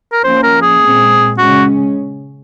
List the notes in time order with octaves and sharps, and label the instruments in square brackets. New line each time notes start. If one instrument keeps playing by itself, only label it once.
[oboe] A#4
[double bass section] F3 A#3 C#4 [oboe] C5
[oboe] A#4
G#4
[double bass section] A#2 G#3 C4
[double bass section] C#3 G#3 C#4 [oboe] F#4